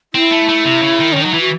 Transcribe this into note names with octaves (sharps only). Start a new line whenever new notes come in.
C4 E4
A3
A3
C3
C#3
D#3
D#3 C#4
F#3 D#4
E3 E4
F#4